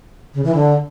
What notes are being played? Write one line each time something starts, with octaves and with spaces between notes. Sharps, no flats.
C#3
E3
D3